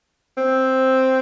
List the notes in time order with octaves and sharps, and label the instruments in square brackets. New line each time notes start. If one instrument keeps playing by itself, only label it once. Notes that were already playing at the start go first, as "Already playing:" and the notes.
[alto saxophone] C4